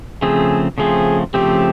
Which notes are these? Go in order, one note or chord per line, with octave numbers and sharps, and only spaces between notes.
C#3 F3 A3 C4 G#4
C#3 F3 A3 C4 G#4
C#3 F3 A3 C4 G4